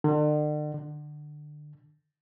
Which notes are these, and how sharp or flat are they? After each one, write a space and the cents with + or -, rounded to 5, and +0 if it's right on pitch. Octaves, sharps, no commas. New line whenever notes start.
D3 +45
D3 +25